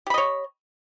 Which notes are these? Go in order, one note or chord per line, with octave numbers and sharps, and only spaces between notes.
G4 C#5 D#5 B5